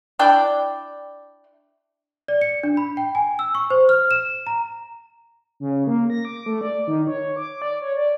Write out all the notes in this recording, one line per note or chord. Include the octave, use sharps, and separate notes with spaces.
D4 E4 D5 G5
D5
C#7
D4
B5
G5
G#5
E6
C#6
C5
F6
E7
A#5
C#3
A#3
A#6
D6
A3
D5
D#3
C#5
D6
D5
C#5
D5